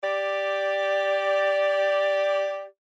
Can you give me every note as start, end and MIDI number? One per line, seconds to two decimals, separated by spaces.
0.03 2.65 67
0.03 2.65 74